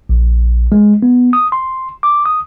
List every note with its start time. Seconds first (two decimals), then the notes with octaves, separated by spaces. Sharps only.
0.09 A#1
0.72 G#3
1.03 B3
1.33 D#6
1.52 C6
2.03 D6
2.26 D#6